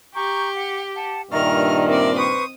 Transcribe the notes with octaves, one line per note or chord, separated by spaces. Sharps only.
G4 A#5 C#6 G6
F#5
F#5 A5
G2 A#2 D#3 E5 A#5 C#6 F6
C4 A#4 D5 E5
B4 C5 C#6 D#6